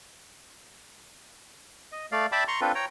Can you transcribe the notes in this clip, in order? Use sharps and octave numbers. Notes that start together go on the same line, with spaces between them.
D#5
A3 D5 F5
D5 E5 G5 A5 B5 D6
A#5 C6 C#6
C4 D4 F4 A4 B4
C#5 G5 A#5